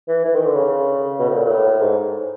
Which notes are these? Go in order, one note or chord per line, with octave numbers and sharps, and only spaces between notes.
E3
E3
D#3
D3
C#3
B2
A2
A#2
A#2
A2
G#2